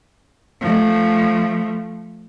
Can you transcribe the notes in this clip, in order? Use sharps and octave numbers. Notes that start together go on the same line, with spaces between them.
F3 A3